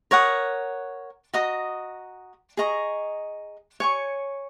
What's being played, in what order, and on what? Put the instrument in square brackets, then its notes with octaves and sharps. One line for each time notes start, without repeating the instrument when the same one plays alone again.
[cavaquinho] A#4 C#5 F#5 D#6
F#4 D#5 A#5 D#6
G#4 D#5 A#5 C#6
C#5 G#5 C#6